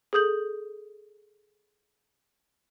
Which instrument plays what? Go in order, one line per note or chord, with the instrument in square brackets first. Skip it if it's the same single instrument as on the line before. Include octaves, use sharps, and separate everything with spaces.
[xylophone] G#4 A4 D#6 G6 F#7